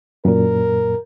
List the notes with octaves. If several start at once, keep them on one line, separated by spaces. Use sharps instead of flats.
F#2 A#2 A#4